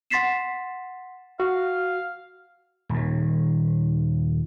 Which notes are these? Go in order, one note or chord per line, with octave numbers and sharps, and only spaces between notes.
F#5 C6 A6 B6 C7 E7
F#4 F5
D#1 D#2